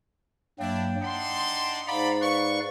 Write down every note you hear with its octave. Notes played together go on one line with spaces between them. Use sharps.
G2 F#3 A#3 D4 E4 G5
D4 D#4 F#5 C6
G#2 D5 F5 F#5 A#5 B5
B4 D5 F5 C#6